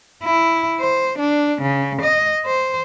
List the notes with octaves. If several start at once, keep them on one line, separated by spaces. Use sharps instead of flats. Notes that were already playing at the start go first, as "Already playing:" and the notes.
E4
C5
D4
C#3
D#5
C5